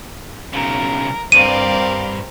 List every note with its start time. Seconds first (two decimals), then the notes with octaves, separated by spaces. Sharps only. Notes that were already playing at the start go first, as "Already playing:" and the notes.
0.53 B1 C#3 A#4
1.32 G2 C4 A#4 D5 F5 D#7